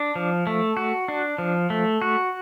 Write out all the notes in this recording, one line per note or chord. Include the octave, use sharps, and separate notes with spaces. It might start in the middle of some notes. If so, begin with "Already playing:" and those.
Already playing: D4
F3
A3
F#4
D4
F3
A3
F#4